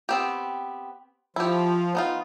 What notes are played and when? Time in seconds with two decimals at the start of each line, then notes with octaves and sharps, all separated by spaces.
0.09 B3 C4 G4
1.36 F3 E4 G4
1.95 B3 D#4 F4